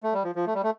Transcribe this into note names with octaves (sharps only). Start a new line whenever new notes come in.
A3
G3
F3
F3
A3
G3
A3